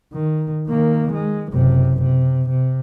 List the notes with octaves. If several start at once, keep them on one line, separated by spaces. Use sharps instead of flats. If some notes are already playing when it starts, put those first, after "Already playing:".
D#3
D#3 A#3
G#3
F#1 C3
C3
C3